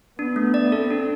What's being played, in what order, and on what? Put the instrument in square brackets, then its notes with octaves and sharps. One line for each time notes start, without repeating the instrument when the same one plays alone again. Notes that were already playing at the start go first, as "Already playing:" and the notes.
[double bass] B3 [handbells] D4
[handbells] A3
D5
[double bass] C4 [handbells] A4
[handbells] D4